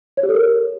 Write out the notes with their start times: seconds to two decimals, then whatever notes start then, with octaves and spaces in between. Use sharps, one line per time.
0.17 C#5
0.23 G4
0.29 A4
0.35 A#4